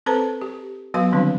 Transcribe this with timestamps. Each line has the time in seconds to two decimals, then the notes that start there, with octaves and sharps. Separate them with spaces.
0.06 C4 A4 B4 C5 A5 A#5
0.41 G4
0.94 F#3 B3 F#4 B4 F5 C6
1.12 D3 D#3 G3 C4 D4